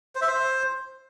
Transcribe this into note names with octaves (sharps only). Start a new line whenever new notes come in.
C5
E5
C5